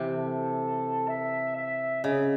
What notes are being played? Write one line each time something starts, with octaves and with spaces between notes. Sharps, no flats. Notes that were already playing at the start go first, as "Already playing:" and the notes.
Already playing: C3 E3
A4
E5
E5
C#3 D#5